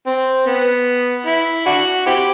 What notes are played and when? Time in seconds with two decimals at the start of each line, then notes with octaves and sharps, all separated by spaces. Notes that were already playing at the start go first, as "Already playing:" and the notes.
0.06 C4
0.46 B3
1.26 E4
1.66 D4 F#4
2.06 C4 E4 G4